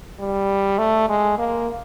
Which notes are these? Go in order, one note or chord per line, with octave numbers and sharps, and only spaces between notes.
G3
A3
G#3
A#3